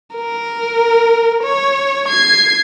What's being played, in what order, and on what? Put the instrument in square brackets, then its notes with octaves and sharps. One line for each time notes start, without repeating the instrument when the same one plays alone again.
[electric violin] A#4
C#5
G#6 C7